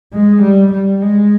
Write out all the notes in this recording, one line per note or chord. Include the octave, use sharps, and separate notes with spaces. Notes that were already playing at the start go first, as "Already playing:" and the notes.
G#3
G3
G3
G#3